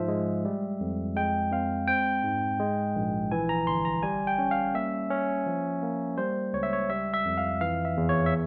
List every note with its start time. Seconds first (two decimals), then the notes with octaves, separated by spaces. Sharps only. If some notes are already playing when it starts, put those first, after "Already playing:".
Already playing: G#2 F3 E5
0.08 G#3
0.45 G3
0.81 F2
1.16 G#3 G5
1.52 C4 F5
1.88 C4 G5
2.24 G#2
2.60 G#3
2.95 A#1
3.32 E3 G#5
3.49 A#5
3.67 G1 C6
3.85 A#5
4.03 G3 G#5
4.27 G5
4.39 C#4
4.51 F5
4.74 A#3 E5
5.10 C#4
5.46 F3
5.83 A#3
6.18 G3 C5
6.53 C#2 C#5
6.63 E5
6.73 C#5
6.90 G3 E5
7.14 E5
7.25 F2
7.38 F5
7.61 E3 F5
7.85 E5
7.97 E2
8.09 C#5
8.26 E5